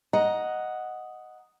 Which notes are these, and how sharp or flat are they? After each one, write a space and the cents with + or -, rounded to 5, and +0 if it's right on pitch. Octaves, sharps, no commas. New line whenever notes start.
D#5 +0 F#5 +0 A#5 +15